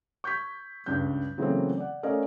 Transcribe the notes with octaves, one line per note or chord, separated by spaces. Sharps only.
C#6 G6 G#6 B6
C#2 G2 D4 G6
C#3 E3 F#3 A3 A#3 C4
D5 F#5
A3 C#4 A#4 D5 D#5 F5